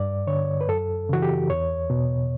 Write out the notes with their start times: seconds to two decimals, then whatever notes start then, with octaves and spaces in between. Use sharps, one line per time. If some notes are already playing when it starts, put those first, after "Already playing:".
Already playing: G2 D5
0.27 D3 C#5
0.61 B4
0.68 F#2 A4
1.09 C#3 E3 F#4
1.22 G4
1.50 E2 C#5
1.90 B2